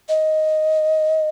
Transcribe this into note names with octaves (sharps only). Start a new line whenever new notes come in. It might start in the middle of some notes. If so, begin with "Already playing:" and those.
D#5